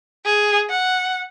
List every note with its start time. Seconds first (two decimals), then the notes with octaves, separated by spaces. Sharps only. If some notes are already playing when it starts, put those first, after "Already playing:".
0.25 G#4
0.70 F#5